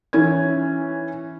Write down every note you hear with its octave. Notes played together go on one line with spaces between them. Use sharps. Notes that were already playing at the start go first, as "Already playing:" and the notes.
E3 C#4 G#6